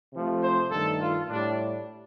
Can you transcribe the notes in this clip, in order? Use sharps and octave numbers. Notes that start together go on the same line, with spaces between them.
C3 F3 A3
C5
G2 D#3 A3 A4
F4
A2 G3 D4